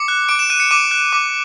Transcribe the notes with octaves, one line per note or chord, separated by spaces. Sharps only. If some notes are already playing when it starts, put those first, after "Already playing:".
Already playing: D6 C#7
F#6
D6 D7
E7
F#6 D#7
C#7
D6 D#7
F#6
D6